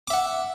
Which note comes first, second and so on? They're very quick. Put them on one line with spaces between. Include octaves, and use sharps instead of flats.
D6 E5 F#5